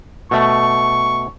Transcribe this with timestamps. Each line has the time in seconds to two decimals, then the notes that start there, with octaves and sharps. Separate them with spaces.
0.31 B2 A3 C#6